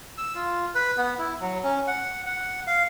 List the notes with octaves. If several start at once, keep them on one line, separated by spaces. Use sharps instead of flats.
E6
F4
B4
B3
E4
F#3
C#4
F#5
F#5
F5